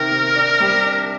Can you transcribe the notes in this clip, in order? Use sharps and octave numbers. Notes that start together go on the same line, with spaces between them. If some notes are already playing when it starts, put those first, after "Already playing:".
Already playing: C3 D#3 A#4
C3
D4
G3
D4